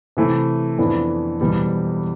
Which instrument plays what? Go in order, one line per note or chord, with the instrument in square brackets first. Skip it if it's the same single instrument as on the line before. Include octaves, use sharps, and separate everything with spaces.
[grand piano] C3 E3 A3
F2 E3 B3 D4
E1 E2 B2 G3 B3